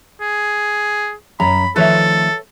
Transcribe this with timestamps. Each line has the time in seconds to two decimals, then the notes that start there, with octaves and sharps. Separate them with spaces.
0.21 G#4
1.40 F#2 A#5 B5
1.76 D#3 F3 A3 A4 B4 C#5 E5